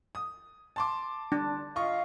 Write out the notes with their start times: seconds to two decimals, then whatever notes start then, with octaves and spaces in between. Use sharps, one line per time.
0.15 D#6
0.76 A5 C6 D6
1.32 D4
1.76 F4 D#5 F5 C#6